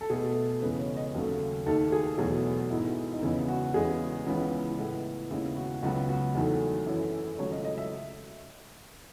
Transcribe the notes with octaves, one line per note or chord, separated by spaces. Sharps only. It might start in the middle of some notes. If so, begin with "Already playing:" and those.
A4
B2 A3 G#4
E2 C#3 G#3 B3 B4
C#5
D#5
D#2 C#3 F#3 A3
D#2 D#3 A3 A4
G#4
E2 B2 F#3 A3 G#4
G#2 D#3 G#3 B3 E4
D#4
E2 C#3 G#3 B3 E4
F#4
E2 C#3 G#3 B3 G#4
C#2 C#3 E3 B3
A2 G#3 B3 E4
D#2 C#3 G#3 B3 E4
F#4
C#2 C#3 F#3 B3 F#4
F#4
E2 D#3 F#3 A3
F#2 E3 A3 E4
E4
C#2 C#3 F#3 A3 C#5
D#5
D#5
E5